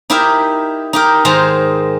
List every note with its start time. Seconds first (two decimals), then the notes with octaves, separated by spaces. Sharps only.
0.10 D#4 E4 G4 A#4 E5
0.93 D#4 G4 A#4
1.25 G#2 D#3 G#3 G#4 C5 A#5